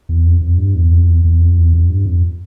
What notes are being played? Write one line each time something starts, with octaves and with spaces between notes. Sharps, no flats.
E2
F2
F2
G2
E2
F2
E2
E2
F2
E2
F2
G2
F2